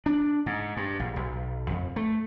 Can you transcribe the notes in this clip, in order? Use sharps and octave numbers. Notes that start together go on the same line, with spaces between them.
D4
G#2
G2
A#1
B1
F2
A3